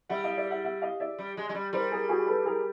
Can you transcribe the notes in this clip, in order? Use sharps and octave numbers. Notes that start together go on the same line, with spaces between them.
G3 E5 F#5
D#5 F5
D5 E5
E5 F#5
E5 F#5
D#5 F5
D5 E5
G3
G#3
G#3
G3
G3 A#4 C5
G#4 A#4
F#4 G#4
A4 B4
G#4 A#4